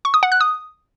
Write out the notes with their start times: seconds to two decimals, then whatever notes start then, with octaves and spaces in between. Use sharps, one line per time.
0.05 C#6
0.14 D#6
0.23 F#5
0.32 F#6
0.41 D#6